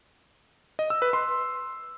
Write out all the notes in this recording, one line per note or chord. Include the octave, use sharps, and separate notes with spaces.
D#5
E6
B4
C6